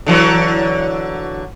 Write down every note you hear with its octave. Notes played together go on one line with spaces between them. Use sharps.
D3 E3 F#3